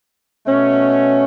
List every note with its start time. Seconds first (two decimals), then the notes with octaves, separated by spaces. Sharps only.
0.46 B2 A3 C#4